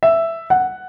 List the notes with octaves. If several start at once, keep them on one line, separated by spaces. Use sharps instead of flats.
E5
F#5